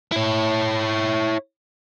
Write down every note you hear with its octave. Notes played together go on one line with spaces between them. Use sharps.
E4 C#5